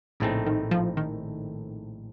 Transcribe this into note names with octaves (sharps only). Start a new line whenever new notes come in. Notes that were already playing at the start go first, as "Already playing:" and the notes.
A#1 A2 C#3 A3 C4 D#4
D#3
F3
D#3